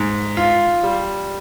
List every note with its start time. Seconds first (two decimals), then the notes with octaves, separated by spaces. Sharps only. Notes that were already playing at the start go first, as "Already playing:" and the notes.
Already playing: G#2
0.37 F4
0.83 G3